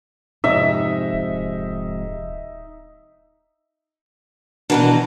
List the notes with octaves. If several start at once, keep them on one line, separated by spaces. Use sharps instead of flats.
F2 G#2 C3 D#4 E5
D1
B2 D#3 E3 D4 F#4 A#4